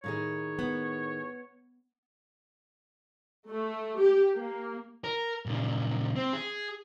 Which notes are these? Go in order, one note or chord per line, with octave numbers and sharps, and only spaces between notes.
A2 D#3 G#4 C#5
B3
A3
G4
A#3
A#4
A#2 C#3
C4
G#4